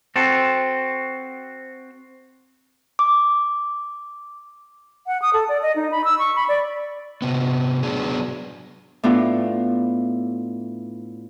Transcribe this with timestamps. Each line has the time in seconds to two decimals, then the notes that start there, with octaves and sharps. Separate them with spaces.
0.16 C4 F#4 A4
2.99 D6
5.07 F#5
5.22 D#6
5.33 A4
5.49 D5
5.63 D#5
5.76 D#4
5.92 B5
6.05 E6
6.19 C#6
6.36 B5
6.48 D5
7.22 C3 B3
7.83 F#3 B3 D4 G#4
9.03 A2 B3 D4 F4